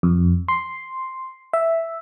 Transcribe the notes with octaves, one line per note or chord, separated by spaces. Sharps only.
F2
C6
E5